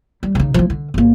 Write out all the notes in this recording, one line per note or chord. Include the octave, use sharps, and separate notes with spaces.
G3
C#3 D#4
F3 E4
D3
G1 A#3